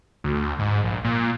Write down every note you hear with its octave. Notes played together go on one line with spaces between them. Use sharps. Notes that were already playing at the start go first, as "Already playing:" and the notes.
D2
G#2
A#1
A#2